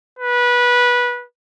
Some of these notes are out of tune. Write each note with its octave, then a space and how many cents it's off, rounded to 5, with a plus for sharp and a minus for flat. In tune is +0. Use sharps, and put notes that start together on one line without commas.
B4 -20